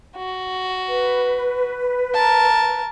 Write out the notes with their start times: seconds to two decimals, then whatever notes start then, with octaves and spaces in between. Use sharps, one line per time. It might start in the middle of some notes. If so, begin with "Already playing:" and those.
0.17 F#4
0.87 B4
2.14 A#4 A5